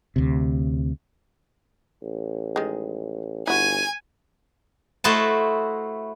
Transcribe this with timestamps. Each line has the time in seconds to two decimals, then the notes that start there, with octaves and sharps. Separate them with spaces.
0.16 D2 C3
2.02 A1
2.56 D#3 G#3
3.47 G1 E4 F#4 G#5
5.04 A3 E4 F#4 C5 D#5 A5